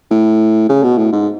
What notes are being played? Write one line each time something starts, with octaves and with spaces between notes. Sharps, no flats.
A2
C#3
B2
A2
G#2